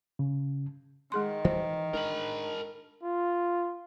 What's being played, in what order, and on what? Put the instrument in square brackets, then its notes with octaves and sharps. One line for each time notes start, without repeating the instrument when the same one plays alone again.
[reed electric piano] C#3
[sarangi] D#3 [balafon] G#3 G#4 C6
[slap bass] E3 [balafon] C5
[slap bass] G#3 D4 [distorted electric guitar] A#4 B5
[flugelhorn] F4